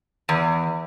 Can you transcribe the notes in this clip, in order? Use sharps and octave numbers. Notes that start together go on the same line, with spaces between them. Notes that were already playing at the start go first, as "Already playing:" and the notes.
E2